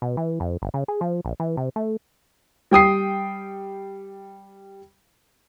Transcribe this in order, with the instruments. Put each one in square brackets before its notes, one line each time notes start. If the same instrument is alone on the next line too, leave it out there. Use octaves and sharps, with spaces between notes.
[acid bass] B2
E3
F2
G1
C#3
G#4
F3
A#1
E3
C3
A3
[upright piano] G3 G5 D#6 C7